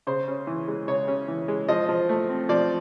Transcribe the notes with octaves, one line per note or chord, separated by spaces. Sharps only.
C#3 C5
C#4
E3
G#3
C#3 C#5
C#4
E3
G#3
F3 D#5
F3
A3
C4
F3 D5